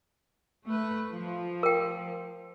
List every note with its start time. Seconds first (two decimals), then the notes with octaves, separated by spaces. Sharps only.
0.66 A3 B4
1.12 F3
1.63 A#4 G5